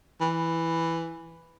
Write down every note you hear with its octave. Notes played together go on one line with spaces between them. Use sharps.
E3